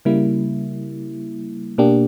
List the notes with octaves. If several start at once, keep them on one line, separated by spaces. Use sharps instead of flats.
C#3 G3 A#3 E4
B2 A#3 D4 G4